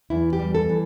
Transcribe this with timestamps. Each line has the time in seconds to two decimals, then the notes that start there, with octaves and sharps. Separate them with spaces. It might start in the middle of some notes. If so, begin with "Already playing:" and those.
0.10 E2 E4
0.33 G4
0.39 G3
0.55 A4
0.69 E3